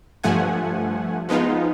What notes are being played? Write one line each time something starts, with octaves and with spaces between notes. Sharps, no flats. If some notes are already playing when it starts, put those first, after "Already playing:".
G2 F3 A3 F#5 G#5
F3 G#3 B3 D#4 F4